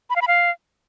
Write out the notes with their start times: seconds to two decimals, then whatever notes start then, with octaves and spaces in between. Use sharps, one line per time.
0.10 B5
0.16 F5
0.22 B5
0.28 F5